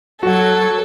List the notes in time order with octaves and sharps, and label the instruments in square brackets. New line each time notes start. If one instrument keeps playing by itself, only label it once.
[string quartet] F#3 G#6 [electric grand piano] F#4 F#5 [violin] A4